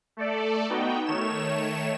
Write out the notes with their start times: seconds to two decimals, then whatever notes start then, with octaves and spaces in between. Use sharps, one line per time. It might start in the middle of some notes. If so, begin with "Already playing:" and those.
0.17 A3 A4 D5
0.69 B3 D#4 F#4 G5
1.06 D#3 A3 C#5 E7